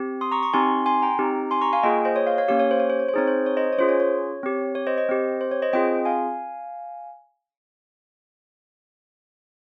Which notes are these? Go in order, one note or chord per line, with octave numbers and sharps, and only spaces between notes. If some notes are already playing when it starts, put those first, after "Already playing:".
Already playing: C4 G4
C6 D#6
A#5 C#6
A#5 C#6
C4 D#4 G4 G#5 C6
G#5 C6
G5 A#5
C4 D#4 G4
G#5 C6
A#5 C#6
F5 G#5
A#3 F4 G#4 D#5 G5
C5 D#5
C#5
C#5 F5
C#5 F5
A#3 C#4 G4 C#5 F5
C#5
C5
C#5
C5
C#5
C5
C4 D#4 G#4 C#5
C5
C#5
C5 D#5
C#5
C#4 F4 G#4 C5
C#5
C#5
C4 G4
C#5
C5 D#5
C5 D#5
C4 G4
C5
C#5
C5 D#5
C4 F4 G#4 D#5 G5
F5 G#5